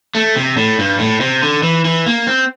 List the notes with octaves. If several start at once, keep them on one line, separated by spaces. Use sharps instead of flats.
A3
C3
A2
G2
A2
C3
D3
E3
E3
A#3
C4